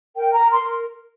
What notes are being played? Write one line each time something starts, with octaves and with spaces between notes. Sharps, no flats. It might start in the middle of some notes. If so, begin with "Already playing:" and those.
A#4 G5
A#5
A#4
C6
A#4